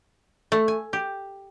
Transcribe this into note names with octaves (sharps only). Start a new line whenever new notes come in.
A3
G#5
G4